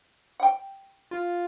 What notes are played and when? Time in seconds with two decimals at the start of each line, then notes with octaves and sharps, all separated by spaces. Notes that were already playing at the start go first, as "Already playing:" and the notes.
0.40 F#5 G5
1.11 F4